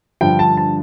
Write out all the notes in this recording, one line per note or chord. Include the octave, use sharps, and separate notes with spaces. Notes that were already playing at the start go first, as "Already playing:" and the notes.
G2 D3 F3 G5
A5
A5